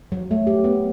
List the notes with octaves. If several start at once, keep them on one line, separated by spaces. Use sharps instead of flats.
F#3
A3
G4
B3